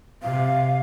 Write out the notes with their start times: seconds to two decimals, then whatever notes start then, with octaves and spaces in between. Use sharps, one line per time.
0.22 C3 F5